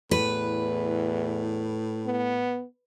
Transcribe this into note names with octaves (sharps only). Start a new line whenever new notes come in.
E2 A2 B4
B3